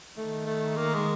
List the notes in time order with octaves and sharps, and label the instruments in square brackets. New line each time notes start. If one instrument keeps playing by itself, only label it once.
[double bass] D#3 [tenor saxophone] A3
[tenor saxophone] A3
A#3
G#3